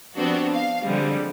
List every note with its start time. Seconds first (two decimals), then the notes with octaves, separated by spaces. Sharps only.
0.15 F3 G3 B3 C4 D4 F#4
0.53 F5
0.82 D3 F3 G3 G#3 C4